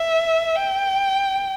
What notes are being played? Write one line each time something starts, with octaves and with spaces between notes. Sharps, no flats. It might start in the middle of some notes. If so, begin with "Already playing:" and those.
Already playing: E5
G5